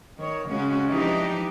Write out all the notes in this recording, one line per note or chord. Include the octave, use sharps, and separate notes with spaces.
D#3 C#5
C#3 G#3 C#4 F#4
E3 F3 D4 D#4 G4